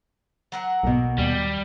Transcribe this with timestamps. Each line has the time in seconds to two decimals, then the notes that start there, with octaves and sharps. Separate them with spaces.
0.52 F#3 A#4 F#5
0.84 B1 B2 A#3
1.18 D#2 G3